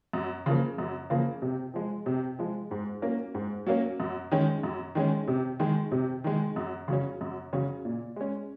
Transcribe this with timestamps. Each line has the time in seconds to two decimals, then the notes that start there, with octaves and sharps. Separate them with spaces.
0.13 F#2
0.46 C#3 F3 A#3
0.78 F#2
1.10 C#3 F3 A#3
1.42 C3
1.74 F3 G#3
2.06 C3
2.39 F3 G#3
2.71 G#2
3.02 F#3 A#3 C#4
3.34 G#2
3.67 F#3 A#3 C#4
4.00 F#2
4.31 D#3 G#3 C#4
4.63 F#2
4.95 D#3 G#3 C#4
5.28 C3
5.60 D#3 G#3
5.92 C3
6.24 D#3 G#3
6.56 F#2
6.88 C#3 F#3 C#4
7.21 F#2
7.53 C#3 F#3 C#4
7.85 A#2
8.16 G#3 C#4